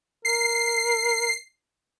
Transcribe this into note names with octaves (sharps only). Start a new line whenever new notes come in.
A#4 C7